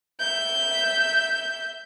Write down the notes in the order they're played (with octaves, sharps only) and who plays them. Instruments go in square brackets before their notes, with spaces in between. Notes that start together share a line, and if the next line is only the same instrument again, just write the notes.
[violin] E5 G6